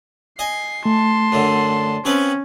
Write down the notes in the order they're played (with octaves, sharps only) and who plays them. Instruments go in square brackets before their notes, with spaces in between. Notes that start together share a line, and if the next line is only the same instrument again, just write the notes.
[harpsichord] D#5 G#5 [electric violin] C7
[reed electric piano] A3 [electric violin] A5 C6
[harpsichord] F#2 D3
[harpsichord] F3 C4 B4 [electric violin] C#4